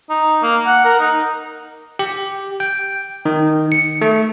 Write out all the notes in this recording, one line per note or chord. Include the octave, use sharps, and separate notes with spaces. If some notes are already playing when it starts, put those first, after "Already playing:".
D#4
A#3
F#5
A#4
D#4
G4
G5
D#3
C#7
A3